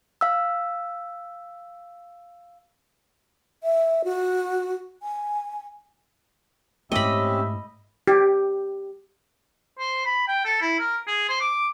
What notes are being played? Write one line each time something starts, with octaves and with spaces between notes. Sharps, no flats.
F5 E6
E5
F#4
G#5
G#2 A3 C4 C#4 G4 D#5 E5 B5
G4
C5
B5
G5
A4
E4
A#4
G#4
C5
D6